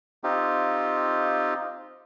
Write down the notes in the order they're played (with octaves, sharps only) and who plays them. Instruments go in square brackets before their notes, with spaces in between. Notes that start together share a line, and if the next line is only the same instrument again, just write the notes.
[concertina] C4 D#4 F4 G4